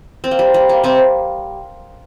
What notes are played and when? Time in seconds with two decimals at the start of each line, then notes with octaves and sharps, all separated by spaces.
0.24 C4
0.31 A#3
0.39 G3
0.54 G3
0.69 A#3
0.84 C3 C4